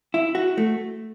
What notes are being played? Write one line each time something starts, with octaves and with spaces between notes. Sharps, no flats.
E4
F#4
A3